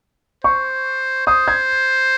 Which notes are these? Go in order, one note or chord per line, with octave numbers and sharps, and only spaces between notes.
C5 C#6
C5 D#6
G#6